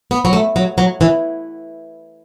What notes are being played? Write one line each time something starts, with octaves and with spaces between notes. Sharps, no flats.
B3
F#3
A3
F#3
F#3
E3